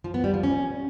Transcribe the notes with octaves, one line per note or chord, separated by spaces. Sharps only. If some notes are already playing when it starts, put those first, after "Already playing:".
F3
B3
G3
F3
C#4